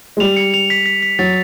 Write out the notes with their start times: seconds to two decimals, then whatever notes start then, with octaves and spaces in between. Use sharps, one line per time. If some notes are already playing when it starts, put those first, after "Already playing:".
0.17 G#3
0.20 G3 F7
0.37 C#7
0.54 F7
0.70 B6
0.86 B6
1.03 B6
1.19 F#3 A6